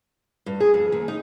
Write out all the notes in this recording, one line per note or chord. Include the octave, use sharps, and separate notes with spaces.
G2
G#4
F2
D#2
D#4